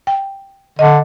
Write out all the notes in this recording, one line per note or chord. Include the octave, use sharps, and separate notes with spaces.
G5
D3 D#5